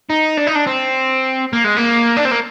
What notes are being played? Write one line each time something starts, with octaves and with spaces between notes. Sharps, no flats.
D#4
D4
D#4
D4
C4
A#3
G#3
A#3
D4
C4
A#3